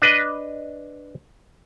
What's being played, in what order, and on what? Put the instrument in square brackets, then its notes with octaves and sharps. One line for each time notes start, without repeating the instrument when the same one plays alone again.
[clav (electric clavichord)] D4 B4 D#5